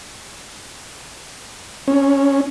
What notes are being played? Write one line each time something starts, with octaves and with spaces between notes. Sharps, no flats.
C#4